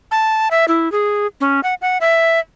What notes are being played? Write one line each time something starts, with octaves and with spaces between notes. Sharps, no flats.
A5
E5
E4
G#4
C#4
F#5
F#5
E5